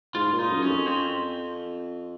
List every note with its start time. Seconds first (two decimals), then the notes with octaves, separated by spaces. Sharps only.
0.14 G#2 F4
0.33 A#2
0.39 D#4
0.50 F#2
0.62 C#4
0.68 F2
0.86 C4